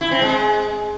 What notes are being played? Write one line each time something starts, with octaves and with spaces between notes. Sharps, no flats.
E4
C4
G#3